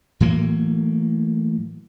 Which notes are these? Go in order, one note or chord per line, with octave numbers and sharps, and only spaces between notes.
A2 E3 F#3 A#3